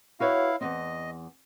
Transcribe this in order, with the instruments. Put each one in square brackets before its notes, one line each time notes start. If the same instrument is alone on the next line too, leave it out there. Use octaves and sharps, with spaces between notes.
[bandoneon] E4 F5 [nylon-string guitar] F#4 B4 C#5
[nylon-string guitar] E2 G#2 C4 [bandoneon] D#5